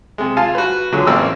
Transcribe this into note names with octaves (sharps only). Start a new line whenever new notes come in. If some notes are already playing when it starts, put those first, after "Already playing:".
C3 G#3
F4 F5 G#5 A5
F#4 B4
A#2 D3 F#3 G#3
A1 A#3 C4 A#4 E6